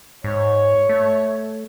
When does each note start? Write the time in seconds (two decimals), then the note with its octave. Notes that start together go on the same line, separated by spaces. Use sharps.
0.24 G#2 C#5
0.89 A3